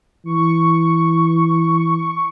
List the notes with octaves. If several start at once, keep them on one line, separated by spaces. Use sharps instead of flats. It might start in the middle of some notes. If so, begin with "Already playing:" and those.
E3 C#6